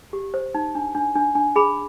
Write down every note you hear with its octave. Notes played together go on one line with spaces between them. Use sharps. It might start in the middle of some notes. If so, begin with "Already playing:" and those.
G4
C5
D#4
D4
D4
D4
D4
G#4 B5